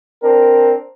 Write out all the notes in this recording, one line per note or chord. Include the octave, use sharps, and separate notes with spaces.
C4 D4 A#4